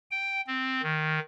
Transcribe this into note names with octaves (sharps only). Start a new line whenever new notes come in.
G5
C4
D#3